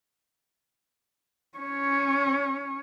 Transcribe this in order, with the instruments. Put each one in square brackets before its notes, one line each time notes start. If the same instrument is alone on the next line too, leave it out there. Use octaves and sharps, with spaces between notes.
[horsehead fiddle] C#4 C#5